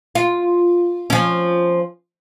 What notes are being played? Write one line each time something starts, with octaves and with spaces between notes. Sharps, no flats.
F4
F3 C#4